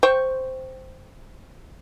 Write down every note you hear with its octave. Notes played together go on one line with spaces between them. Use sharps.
C5 G5 C#6